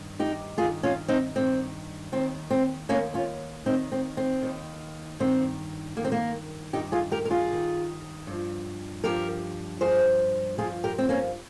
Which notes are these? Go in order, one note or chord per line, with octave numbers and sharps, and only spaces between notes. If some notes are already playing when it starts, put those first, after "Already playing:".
Already playing: G2 D#3
D#4 G4
G2 D#3 F4 G#4
C#4 F4
C4 D#4
G2 D#3 C4
D#2 D#3 C4
C4
D#2 D#3 A#3 C#4
C#4 F4
D#2 D#3 C4 D#4
C4
C4
D#2 D#3
G2 D#3 C4
G2 D#3 A#3
C4
A#3
G2 D#3 D#4 G4
F4 G#4
G4 A#4
A#4
F4 G#4
G2 D#3
G2 F3
G2 F3 G4 A#4
G2 F3 G#4 C5
G2 F3 F4 G#4
G4 A#4
C4
A#3 C#4